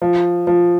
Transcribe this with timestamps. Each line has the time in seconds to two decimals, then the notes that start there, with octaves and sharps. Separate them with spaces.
0.02 F3
0.47 F3